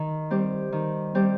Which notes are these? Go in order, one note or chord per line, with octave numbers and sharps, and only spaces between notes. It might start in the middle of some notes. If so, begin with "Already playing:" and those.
Already playing: D#3
G3 C4 G4
D#3
G3 C4 G4